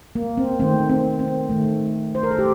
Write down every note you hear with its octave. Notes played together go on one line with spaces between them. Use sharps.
A#3
C4
D#3 A3 C4
C4
C4
D#3 A3
C5
A#4
A4
A3 G4